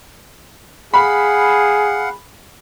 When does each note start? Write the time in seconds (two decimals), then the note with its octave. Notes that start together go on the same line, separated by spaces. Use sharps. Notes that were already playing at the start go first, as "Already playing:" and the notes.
0.94 G#4 F5 F#5 B5